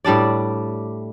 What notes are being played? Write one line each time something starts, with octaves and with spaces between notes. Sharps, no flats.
A2 G3 D4 D5